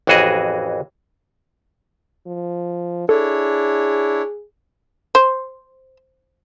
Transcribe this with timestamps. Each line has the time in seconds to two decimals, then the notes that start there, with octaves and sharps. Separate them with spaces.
0.07 A1 F2 E3 F#4 G#4 D#5
2.27 F3
3.09 D4 E4 G#4 A4 C#5
5.15 C5